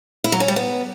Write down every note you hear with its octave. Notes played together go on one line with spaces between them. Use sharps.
E4
F#3
C#4
G3
B3